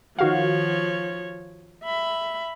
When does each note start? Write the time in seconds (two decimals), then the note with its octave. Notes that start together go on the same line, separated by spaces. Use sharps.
0.19 D#3 F3 F#4 C#5 F5
1.84 E5 B5